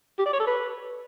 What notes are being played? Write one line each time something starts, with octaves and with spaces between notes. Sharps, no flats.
G4
D5
C#5
A4
B4